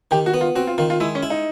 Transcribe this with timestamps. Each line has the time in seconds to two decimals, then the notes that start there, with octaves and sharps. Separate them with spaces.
0.11 D#3 G4
0.26 F#4
0.34 B3
0.41 F4
0.55 C4 F#4
0.67 F4
0.78 D#3 F4
0.90 F4
1.00 G#3 E4
1.15 C#4
1.23 E4
1.30 D#4